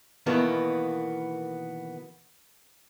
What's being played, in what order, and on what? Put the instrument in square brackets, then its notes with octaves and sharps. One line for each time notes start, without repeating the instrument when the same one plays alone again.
[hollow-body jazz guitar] B2 D#3 E3 A#3 B3